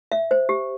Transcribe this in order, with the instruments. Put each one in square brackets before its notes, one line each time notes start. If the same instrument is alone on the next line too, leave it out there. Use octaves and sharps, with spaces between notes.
[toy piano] E5
C5
G4